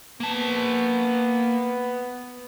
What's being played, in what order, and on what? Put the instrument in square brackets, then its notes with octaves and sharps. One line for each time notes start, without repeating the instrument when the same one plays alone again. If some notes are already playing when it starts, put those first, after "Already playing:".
[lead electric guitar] A#3 A5 [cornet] B3